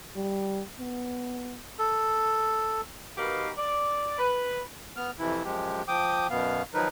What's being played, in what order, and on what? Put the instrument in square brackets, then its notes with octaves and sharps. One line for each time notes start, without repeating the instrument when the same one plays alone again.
[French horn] G3
B3
[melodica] A4
[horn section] B2 D#3 G4 A#4 B4 F5
D5
B4
[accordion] B3 F6
F2 C3 E3 E4
F#2 F3 G#3 G4
F3 G5 D6 D#6
F#2 B2 B3 F5
D#3 F3 F#3 D#4 A#4 B4